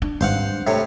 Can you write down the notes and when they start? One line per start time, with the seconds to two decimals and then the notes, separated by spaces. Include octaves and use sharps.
0.02 D4
0.21 G#1 G2 C5 F5 F#5
0.67 A2 C3 C#5